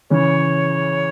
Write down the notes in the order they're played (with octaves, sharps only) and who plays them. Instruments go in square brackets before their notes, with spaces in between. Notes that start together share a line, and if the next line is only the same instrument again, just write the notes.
[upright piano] C#3 E3 C#4 [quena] C#5